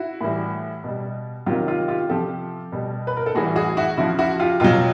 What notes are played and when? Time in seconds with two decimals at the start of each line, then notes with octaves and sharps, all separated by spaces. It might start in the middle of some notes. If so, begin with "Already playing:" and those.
Already playing: E4 F#4
0.21 A2 E3 G3
0.84 B2 G3
1.46 C3 D#3 F#3 F4 G4
1.67 F4 G4
1.88 F4 G4
2.09 C3 F3 G4 A4
2.72 B2 G3
3.07 B4
3.17 A#4
3.26 A4
3.35 A2 E3 G3 F#4 G#4
3.56 F#4 G#4
3.77 E4 F#4
3.97 C#3 F3 E4 F#4
4.19 E4 F#4
4.39 F4 G4
4.60 B2 F#3 F4 G4